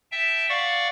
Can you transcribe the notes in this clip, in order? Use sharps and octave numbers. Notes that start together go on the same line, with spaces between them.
E5 G5 A5
D5 F5 F#5 C#6